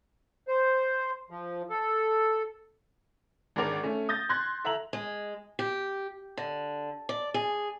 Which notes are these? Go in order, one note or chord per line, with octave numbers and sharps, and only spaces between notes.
C5
F3
A4
G#1 G#3 D4 A#4 D5 F7
A3 C#4
D#6 G6 A6 A#6
C6 F#6 G#6 A#6
A4 E5 A#5 F#7
G#3
G4
D3
D5
G#4